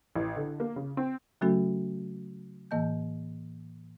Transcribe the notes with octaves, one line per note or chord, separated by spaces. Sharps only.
A1
D3
A#3
C#3
C4
C#3 F#3 A3 C#4 F#4 A4
A2 E3 A#3 D#5 A5 G6